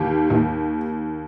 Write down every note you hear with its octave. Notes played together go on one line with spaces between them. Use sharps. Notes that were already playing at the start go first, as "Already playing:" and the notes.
Already playing: D#2 G4
D#2